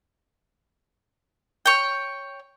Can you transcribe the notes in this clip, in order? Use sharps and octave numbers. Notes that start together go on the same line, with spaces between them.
C#5 G5